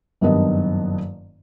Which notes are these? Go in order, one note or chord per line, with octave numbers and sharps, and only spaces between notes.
F#1 G2 D#3 B3 D4 D#5